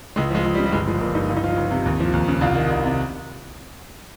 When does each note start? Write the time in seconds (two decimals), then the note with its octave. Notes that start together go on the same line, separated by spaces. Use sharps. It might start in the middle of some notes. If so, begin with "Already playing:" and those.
0.16 C#2 G#3
0.31 F3 G#3
0.45 C#2
0.54 G3
0.59 C#3
0.65 G3
0.72 G1 G#3
0.87 F3 G#3
1.01 G1 A#3
1.14 G2 D#4
1.29 C#2 F4
1.37 D#4
1.44 F3 F4
1.57 C#2
1.71 C3
1.86 D#2
2.00 F3
2.13 D#2
2.28 C#3
2.41 C2 F4
2.55 D#3
2.70 C2
2.84 C3